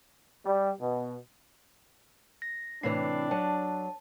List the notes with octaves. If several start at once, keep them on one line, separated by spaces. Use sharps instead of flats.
G3
B2
A#6
A2 C3 E3 D4 C7
F#3 A5